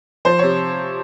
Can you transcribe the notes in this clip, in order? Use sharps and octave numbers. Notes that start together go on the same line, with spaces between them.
F3 C5
C3 C#5